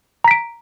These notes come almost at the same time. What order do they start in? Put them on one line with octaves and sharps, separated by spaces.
A#5 B6 D7